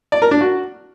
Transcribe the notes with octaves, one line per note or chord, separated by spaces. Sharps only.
D5
A#4
D4
F#4